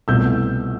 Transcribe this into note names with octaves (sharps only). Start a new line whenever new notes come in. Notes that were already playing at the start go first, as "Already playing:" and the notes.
C2 B2 A3 E4 E6 G6